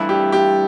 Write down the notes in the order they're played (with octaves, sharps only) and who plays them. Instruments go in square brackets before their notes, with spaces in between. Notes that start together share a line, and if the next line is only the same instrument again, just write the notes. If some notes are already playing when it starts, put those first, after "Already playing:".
Already playing: [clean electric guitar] G2 E3 A3 E4
[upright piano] G4
G4